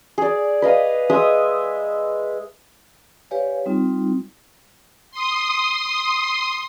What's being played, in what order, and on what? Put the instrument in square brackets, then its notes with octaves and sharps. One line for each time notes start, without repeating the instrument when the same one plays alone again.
[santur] G#4 D5
B4 D#5 F5
G#3 E5 D#6 E6
[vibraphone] G4 B4 C#5 D5 F5 G#5
G3 C4 D#4 F4
[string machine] C6 D#6